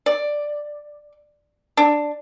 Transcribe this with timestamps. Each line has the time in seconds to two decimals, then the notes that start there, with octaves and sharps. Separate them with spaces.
0.06 D5
1.77 D4